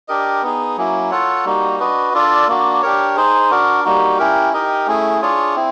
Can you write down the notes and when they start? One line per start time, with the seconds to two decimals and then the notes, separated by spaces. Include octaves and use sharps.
0.08 D4 G4 A#4 D#5
0.42 B3 D#4 G#4
0.77 F#3 A#3 C#4 E4
1.11 F4 A4 C#5 F#5
1.45 G3 A#3 D#4 F#4
1.79 D4 F#4 B4 D#5
2.14 D4 F4 A4 D5
2.48 A#3 D4 F#4
2.82 D4 G4 A#4 C#5
3.16 D#4 G#4 C5
3.50 D4 F#4 A#4
3.85 G3 A#3 D#4 F#4
4.19 C#4 E4 G4 A#4
4.53 D#4 G4 A#4 D#5
4.87 A3 C#4 E4 G#4
5.22 D4 F4 G#4 C#5
5.56 C4 E4